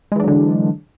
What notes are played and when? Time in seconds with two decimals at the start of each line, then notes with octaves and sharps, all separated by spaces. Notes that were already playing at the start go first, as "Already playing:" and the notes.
0.12 G#3
0.16 E3
0.20 D4
0.24 F#3
0.28 D3